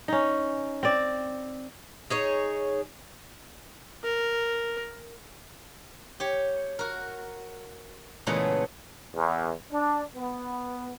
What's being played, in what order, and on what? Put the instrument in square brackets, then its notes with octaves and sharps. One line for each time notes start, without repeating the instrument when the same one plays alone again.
[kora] C#4 D#4
C4 D5
[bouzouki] D#4 G#4 C#5
[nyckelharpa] A#4
[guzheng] G4 C#5
F#4 A#4
A#2 C#3 E3 G#3 A3 B3
[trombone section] E2
D4
B3